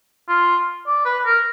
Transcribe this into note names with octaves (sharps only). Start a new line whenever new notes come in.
F4
D5
B4
A#4